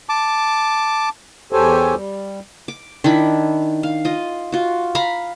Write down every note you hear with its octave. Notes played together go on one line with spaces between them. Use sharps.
A5 D6
E2 G4 A4 C5 C#5 G#5
G3
D6
D#3 D4 E4 B5
F5
F4 D#5
F4 F#4
F5 A#5 B5